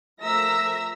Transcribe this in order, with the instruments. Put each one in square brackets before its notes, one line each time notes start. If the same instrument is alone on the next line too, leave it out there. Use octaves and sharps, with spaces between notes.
[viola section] F3 A3 A#4 [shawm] E5 [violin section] A#5 E6 A#6